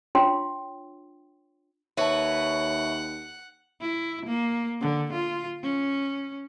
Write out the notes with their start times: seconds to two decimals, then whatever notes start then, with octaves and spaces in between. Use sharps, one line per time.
0.15 D4 F4 C#5 G5 C6
1.97 D#2 B4 C#5 E5 F#5 A5
3.81 E4
4.26 A#3
4.81 D3
5.13 F4
5.63 C#4